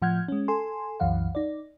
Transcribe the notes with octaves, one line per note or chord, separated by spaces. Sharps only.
A2 F3 F#5 F6 G6 G#6
G#3 C#4
A4 G#5 C6
C2 F#2 E3 F5 F#5
D#4 D5